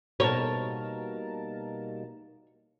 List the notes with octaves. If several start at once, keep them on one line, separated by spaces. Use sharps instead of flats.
B2 G3 A#3 D#4 A#4 C#5 A5